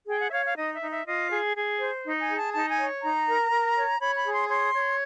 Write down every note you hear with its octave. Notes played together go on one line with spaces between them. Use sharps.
G#4 G5
F#5
E5
C#5 F5
F5
D#4 D#5
E5
D#4
E5
F4 D#5
G#4
G#4
C5
D#4
G#5
G#4
A5
D#4 A5
G#5
C#5
D#4 A#5
A#4
A#4
C#5
C#5 B5
B5
G#4
C6
C#5 C6
C#5